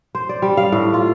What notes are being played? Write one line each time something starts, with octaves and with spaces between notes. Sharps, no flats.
C5
D5
G3
F5
A2
F4